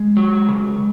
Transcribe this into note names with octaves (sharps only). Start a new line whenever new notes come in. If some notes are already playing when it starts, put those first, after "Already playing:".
Already playing: G#3
F#3
C#3